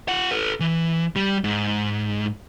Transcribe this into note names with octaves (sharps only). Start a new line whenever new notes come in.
F4 F#5
A4 B4
E3
G3
G#2